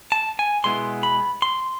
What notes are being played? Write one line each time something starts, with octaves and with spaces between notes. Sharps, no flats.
A5
G#5
B2 G#3 B3 E4 C6
B5
C6